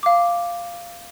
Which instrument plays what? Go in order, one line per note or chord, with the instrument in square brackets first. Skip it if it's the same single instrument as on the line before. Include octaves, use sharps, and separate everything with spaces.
[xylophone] F5 D6